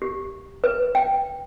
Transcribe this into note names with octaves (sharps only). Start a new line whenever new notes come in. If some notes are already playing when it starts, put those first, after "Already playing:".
G4
B4
G5